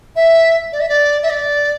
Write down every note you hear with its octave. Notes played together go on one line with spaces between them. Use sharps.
E5
D5
E5
D5
E5
D5